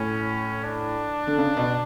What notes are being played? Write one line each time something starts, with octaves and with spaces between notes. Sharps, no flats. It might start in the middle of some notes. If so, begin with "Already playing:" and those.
Already playing: A2 C#4
D4
D3
C#3
B2